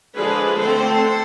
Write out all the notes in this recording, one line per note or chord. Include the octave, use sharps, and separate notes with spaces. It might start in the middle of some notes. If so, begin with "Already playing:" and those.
D3 F3 G#3 D4 G#4 B4
D3 A3 C4 A4 C5